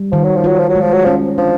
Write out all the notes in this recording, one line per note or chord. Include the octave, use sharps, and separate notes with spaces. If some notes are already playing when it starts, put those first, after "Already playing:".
Already playing: G3
D#3 F3
F#3
F3
F#3 F4
F3
F#3
G#3
F3
F#3
F3 C#4
F3 D4